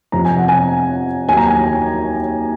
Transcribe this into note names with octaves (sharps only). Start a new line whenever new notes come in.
F2 C3 F3 A#5
G#5
F#5
G#5
D#2 D#3 F#3 G#5
A#5
G#5